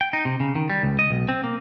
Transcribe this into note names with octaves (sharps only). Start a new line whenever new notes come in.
G5
D#4
C3
C#3
D#3
G3
C#2
D#5
B1
C4
A#3